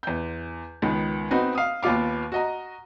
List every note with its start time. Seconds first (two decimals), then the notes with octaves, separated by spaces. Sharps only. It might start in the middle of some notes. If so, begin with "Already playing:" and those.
0.03 E2 G6
0.82 C#2 D#3 B3
1.31 B3 C4 D#4 F#4 B4
1.55 F5 D#6
1.83 D#2 B3 F4 F5 D6
2.32 F#4 D#5 A#5